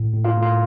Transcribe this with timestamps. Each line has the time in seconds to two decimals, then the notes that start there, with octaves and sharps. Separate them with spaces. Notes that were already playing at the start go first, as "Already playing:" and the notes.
Already playing: A2
0.13 A2
0.25 F4 F5
0.37 A2
0.43 F4 F5